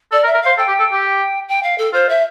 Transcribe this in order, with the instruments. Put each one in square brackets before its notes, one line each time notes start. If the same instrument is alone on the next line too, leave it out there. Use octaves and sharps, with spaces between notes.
[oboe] A4 [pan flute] D5
[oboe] A#4
[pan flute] E5
[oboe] A#4
[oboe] C5 [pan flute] F5
[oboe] A4 [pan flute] G5
[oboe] G4
A4
G4
[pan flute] G5
F5
A4
[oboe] F4 [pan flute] C5
[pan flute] E5